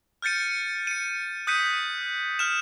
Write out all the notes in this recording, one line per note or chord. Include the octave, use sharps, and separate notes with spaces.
F6 G6 A6 C#7 D#7
C#7 D#7
D#6 F#6 G6 B6 C#7 D#7
F6 E7